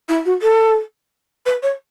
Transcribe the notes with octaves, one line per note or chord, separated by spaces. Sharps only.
E4
F#4
A4
B4
C#5